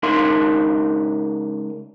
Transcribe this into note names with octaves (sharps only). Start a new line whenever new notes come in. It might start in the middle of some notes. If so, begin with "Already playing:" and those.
C#2 D#4 A#4 F5 C6